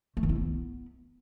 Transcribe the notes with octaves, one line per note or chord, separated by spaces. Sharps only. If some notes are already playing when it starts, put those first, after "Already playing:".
A3
D#3
E4
B3